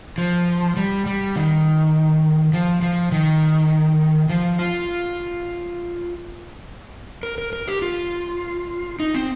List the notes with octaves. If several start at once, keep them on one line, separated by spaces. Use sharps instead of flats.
F3
G3
G3
D#3
F3
F3
D#3
F3
F4
A#4
A#4
A#4
G4
F4
D#4
C4